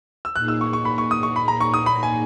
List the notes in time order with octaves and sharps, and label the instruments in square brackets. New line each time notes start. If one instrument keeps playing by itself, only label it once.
[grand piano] E6
[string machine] A#2 A#3 D#4 G#4 [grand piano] F#6
[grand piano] E6
C#6
C#6
B5
C#6
D#6
C#6
B5
A#5
C#6
D#6
B5
G#5